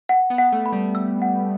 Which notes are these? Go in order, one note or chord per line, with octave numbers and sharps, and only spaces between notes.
F#5
B3
F#5
A3
B5
G3
E6
F#5